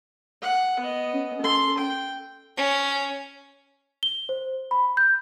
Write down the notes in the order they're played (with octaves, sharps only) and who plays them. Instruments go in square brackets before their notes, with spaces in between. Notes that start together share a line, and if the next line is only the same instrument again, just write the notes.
[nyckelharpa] F#5
B3 D#5
[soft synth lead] C#4
[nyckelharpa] A4 C6
G5
[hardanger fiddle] C#4
[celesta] G7
C5
B5
G6